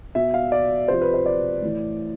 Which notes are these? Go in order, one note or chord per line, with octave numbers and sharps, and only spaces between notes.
B2 E5
F5
D5
C3 F3 C5
B4
C5
D5
A2 E3